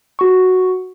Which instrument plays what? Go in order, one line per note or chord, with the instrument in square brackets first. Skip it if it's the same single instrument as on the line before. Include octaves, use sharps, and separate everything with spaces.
[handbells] F#4 C#6